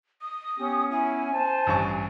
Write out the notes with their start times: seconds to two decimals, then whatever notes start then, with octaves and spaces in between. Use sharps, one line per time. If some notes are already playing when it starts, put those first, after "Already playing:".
0.22 D#6
0.59 B3 C#4 G4
0.91 E4 G#5
1.34 C5 A5
1.67 A1 G2 C#6